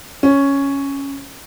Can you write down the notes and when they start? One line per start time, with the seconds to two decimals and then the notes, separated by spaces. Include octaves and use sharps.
0.23 C#4